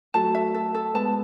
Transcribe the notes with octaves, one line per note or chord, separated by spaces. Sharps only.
F#3 A3 A5
E5
A4
A4
G#3 B3 A5